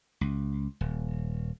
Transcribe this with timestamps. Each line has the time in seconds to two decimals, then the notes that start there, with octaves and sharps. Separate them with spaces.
0.21 C#2
0.81 D#1